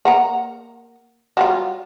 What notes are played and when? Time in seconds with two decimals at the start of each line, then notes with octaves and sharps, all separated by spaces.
0.05 A#3 F#5 A#5
1.37 F#3 G3 F4